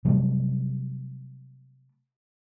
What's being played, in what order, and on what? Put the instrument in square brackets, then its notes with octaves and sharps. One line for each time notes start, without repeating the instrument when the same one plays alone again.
[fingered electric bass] C3 F#3 G3 A3